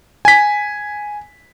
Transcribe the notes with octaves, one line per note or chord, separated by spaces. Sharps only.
G#5 B6